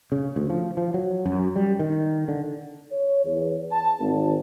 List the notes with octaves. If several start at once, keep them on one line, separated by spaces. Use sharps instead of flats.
C#3
D2
F3
F3
F#3
F#2
G3
D#3
D3
C#5
E2
A5
G#1